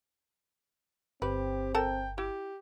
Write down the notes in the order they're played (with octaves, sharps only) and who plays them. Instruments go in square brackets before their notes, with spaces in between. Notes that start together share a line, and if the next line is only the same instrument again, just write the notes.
[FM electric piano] G1 [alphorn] C4 [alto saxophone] G4 [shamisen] B4
[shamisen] A4 A#4 A5 [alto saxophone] G5
[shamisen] E4 [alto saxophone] G4